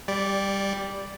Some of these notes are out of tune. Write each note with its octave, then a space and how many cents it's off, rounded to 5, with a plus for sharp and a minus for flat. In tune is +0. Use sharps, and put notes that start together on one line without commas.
G3 +10 D5 -10